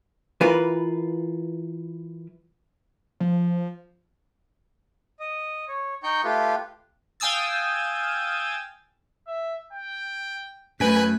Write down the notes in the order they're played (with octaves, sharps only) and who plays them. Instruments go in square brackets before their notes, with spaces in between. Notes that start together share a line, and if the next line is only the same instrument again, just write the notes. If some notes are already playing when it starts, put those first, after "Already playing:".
[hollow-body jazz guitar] E3 F4 A#4 B4
[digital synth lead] F3
[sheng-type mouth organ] D#5
C#5
D#4 G5 C#6 G6
A3 F4 G4 B4
[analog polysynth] F5 G5 G#5 D#6 E6 A6
[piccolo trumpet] E5
G5
[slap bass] F#2 [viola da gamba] A3 [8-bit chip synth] B4 G#5 B6 [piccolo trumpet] F#6